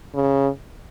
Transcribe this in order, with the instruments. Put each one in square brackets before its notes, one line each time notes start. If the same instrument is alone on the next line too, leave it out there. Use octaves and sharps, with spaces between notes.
[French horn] C#3